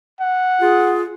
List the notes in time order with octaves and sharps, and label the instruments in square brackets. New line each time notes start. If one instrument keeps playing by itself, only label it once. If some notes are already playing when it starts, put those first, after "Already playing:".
[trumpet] F#5
[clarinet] F4 [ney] G#4